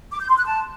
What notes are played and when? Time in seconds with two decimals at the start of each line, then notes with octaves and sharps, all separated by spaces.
0.12 D6
0.21 G6
0.29 C6
0.37 F#6
0.46 A5